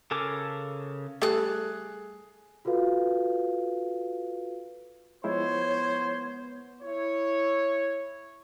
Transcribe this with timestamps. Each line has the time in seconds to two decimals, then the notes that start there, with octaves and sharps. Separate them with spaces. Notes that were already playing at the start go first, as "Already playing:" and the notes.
0.11 C#3 A4 A#4 G#5 D6
1.22 G3 A3 G#4 A4 F#6
2.65 F4 F#4 A4 B4 F5
5.24 F3 G#3 B3 E4 C5 C#5
6.82 E4 C#5